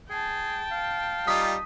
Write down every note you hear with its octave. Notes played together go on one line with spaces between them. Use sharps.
G#4 G5 A5
F5
G3 D#4 F4 D#6 B6